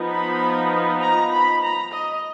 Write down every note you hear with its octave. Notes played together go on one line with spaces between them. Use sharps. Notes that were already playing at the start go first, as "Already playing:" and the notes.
Already playing: F3 B3 D#4
B5
A#5
B5
A#5
D#5